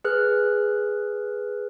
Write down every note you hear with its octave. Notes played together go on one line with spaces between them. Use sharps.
G#4 B4 F6 F#6